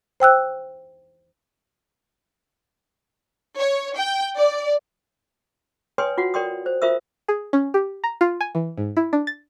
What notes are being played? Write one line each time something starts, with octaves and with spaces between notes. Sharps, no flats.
C5 G5 E6 F#6
C#5
G5
D5
B4 C#5 G5 G#5 C6 D#6
F4 F#4 F#5
A#4 D5 G5 C6 D#6
C5
F4 A#4 C5 E5 D#6 E6
G#4
C#4
G4
A#5
F4
G#5
E3
G#2
E4
D4
A6